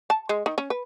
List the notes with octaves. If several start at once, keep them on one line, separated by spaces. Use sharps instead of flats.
A5
G#3
D#3
C#4
B4